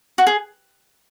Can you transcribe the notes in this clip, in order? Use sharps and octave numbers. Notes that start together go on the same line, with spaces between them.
F#4
G#4